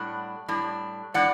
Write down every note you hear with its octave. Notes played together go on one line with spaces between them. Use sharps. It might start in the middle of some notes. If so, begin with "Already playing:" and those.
Already playing: A2 G3 D4 F#5
A2 G3 D4
A2 G3 D4 D5 F#5